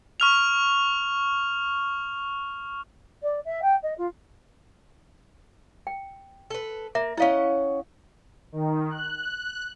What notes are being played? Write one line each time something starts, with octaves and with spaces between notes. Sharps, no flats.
C#6 F6 F7
D5
E5
G5
D#5
F4
G5
A4 B4
A#3 E5
C#4 E4 D#5 F5 F#5
D#3
F#6